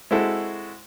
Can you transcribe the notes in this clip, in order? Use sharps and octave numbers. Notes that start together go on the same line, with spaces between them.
G#3 C4 E4 F#4 A4